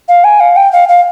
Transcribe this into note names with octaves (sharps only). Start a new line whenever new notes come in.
F5
G#5
F5
G5
F5
F5